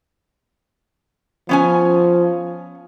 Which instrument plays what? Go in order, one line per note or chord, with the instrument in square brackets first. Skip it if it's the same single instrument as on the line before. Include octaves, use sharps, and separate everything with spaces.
[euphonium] F3 [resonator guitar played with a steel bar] B3 C#4 G#5